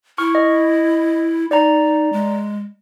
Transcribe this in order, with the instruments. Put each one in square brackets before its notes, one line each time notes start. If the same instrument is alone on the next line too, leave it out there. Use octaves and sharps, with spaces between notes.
[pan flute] E4 [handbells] C#6 F6
[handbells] D#5
[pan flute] D#4 [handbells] D5 A#5
[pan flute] G#3